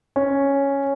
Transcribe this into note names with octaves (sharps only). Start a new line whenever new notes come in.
C#4